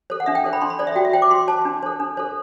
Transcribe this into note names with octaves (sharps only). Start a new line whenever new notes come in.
A4 C5
F#5
D4 E5
G5
A4 C5
B5
D4 C6
B5
A4 C5 D5
E5
F#4 G5
E5
C5 G5
D6
F#4 C6
C5 A5
D4
A4 C5
D4
A4 C5